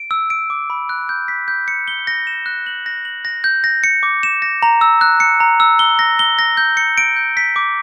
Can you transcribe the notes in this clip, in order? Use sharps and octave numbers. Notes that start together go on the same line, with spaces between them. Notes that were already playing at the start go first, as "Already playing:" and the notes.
Already playing: D7
E6
D7
D6
B5
F#6
G6
B6
G6
C#7
G7
A#6
E7
F#6
F#7
A#6
F#7
A#6
G6
A#6
C#7
D6
E7
A#6
A#5
E6
F#6
C#7
A#5
E6
G7
A#6
G7
A#6
G6
C#7
D7
G6
B6
D6